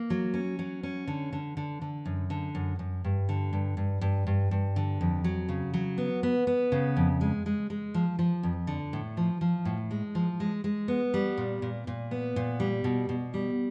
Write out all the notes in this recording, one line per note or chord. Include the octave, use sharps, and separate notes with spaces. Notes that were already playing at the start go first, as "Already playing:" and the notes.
Already playing: A#3
F#3
C#4
F#3
C#4
D3
D3
D3
D3
F#2
D3
F#2
F#2
G2
D3
G2
G2
G2
G2
G2
D3
F2
F#3
C#3
F#3
B3
B3
B3
C#3
F2
G#3
G#3
G#3
F3
F3
F2
D3
A2
F3
F3
A2
G#3
F3
G#3
G#3
B3
G3
A#2
A#2
A#2
B3
A#2
G3
B2
B2
G3